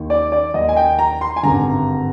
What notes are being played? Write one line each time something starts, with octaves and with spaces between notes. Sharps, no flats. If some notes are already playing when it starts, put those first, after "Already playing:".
Already playing: D#2 D#3
D5
D5
D#2 D#3 D#5
G#5
G5
A#5
C6
G#5
G#1 G2 D3 A#5